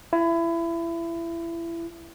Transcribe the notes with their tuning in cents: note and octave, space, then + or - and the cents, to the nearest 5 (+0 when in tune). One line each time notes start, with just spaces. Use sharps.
E4 +25